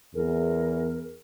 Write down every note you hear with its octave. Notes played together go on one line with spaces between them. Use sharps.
E2 G#4 A#4